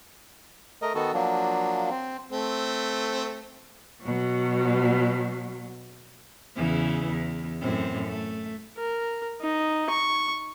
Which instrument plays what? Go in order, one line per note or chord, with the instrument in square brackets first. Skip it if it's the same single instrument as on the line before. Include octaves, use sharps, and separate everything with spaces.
[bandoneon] A3 A#4 D#5
D#3 B3 F#4 A4
F3 F#3 A#3 D4
C4
[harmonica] A3 C4
[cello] B2 F#3
[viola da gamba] E2 C#3 E3
E2
F#2 A2 C4
A3
[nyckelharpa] A#4
D#4
C#6